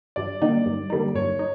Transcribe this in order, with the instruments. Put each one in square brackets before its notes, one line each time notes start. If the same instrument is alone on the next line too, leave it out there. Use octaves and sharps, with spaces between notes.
[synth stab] G2 [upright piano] D5
[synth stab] D3 G3 A#3 D#4
G2
D3 G3 A#3 D#4
[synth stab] G2 [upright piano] C#5
[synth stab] D#4